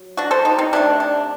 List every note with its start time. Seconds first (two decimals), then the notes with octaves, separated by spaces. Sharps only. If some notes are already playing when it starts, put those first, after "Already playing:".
Already playing: F#3
0.17 D4 F#4
0.31 A4 C5
0.45 D#4 G4
0.59 C4 D#4
0.73 C3 D#3 A3 D4
1.00 D4